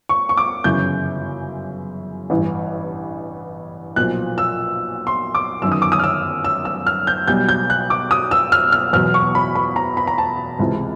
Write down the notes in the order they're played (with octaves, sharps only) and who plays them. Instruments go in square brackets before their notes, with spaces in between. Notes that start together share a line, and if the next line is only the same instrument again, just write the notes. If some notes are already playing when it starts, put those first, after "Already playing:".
[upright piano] C#6
C#6
D6
G1 F#2 C#3 E3 G6
A1 G2 E3
B1 A#2 F3 F#6
E6
C6
D6
G1 F#2 D#3 E6
D#6
D6
D#6
F6
E6
E6
E6
F6
G6
B1 B2 G3 G6
G6
F#6
D6
D#6
E6
F6
F6
E2 B2 F#3 F6
C#6
B5
B5
A#5
B5
A#5
A5
C#2 C3 E3 G#3